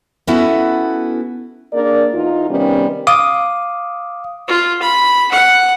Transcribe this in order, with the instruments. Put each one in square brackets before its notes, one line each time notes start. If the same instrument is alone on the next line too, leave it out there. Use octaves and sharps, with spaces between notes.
[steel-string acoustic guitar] B3 C#4 E4 F#4 A4 B4
[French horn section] A#3 D4 G#4 A#4 D5
E2 D#4 F4
C3 D#3 G3 B3 C#4
[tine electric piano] F5 D6 D#6
[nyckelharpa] F4
B5
F#5